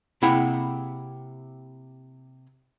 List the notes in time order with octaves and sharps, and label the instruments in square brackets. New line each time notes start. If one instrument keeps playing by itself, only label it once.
[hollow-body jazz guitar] C3 A#3 E4 G#4 F#5 G5